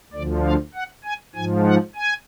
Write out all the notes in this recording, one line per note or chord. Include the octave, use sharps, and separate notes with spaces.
D2 D3 F3 D5
F5
F#5
G#5
G#2 F3 G#5
F#5
G#5